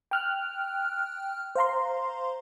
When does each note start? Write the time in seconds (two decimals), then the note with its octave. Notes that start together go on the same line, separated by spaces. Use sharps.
0.11 G5 F6 F#6
1.55 C5 F5 A#5 C6